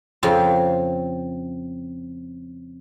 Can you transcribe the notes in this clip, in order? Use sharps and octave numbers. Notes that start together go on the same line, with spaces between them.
F2 C#3 C4 F4